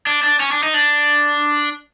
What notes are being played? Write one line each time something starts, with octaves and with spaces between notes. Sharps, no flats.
D4
D4
C#4
D4
D#4
D4